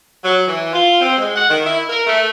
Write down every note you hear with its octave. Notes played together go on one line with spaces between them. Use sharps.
F#3
E3
F4
C4
G#3
F#5
D#3
E4
A#4
A3